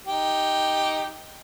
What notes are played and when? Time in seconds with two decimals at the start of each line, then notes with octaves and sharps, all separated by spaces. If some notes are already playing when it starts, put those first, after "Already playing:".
0.07 D#4 G4